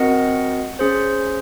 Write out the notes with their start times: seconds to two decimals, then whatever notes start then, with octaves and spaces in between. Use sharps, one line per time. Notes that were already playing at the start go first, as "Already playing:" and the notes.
Already playing: C4 F#4 A#4 D#5 F#5
0.79 C#4 G#4 C5